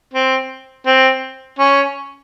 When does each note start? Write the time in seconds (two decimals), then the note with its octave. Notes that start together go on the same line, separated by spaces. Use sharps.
0.14 C4
0.86 C4
1.59 C#4